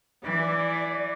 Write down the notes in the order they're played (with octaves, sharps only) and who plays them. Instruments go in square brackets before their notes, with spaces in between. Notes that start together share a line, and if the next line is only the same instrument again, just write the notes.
[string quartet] E3 [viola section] D5